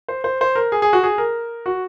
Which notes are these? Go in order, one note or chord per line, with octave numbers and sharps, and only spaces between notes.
C5
C5
C5
A#4
G#4
G#4
F#4
G#4
A#4
F#4